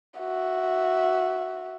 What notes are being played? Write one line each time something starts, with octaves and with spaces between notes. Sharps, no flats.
F#4 E5